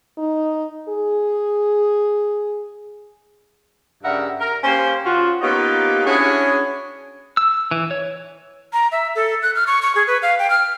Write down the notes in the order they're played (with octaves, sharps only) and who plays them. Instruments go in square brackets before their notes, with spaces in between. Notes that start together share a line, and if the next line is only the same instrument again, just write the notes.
[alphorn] D#4
G#4
[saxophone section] G2 C#3 G3 A#4 E5 F#5
A#4
A#3 C#4 G4 C5
C#3 F4 F#4
A#3 B3 C#4 D#4 F4 G4
C#4 D4 E4 F#4 G#4
[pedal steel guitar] E6
E3
C#5
[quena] A#5
E5
A4
F#6
F6
C#6
C#6
G#4
B4
F5
G5
F6